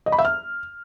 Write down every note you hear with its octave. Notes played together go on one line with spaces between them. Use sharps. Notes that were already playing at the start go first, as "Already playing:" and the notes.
D#5
B5
E5
F6